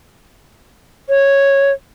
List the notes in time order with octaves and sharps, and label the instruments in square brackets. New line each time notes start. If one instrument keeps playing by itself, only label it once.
[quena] C#5